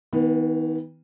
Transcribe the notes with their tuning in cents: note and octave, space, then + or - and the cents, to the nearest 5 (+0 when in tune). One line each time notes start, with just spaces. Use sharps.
D#3 +45 B3 +0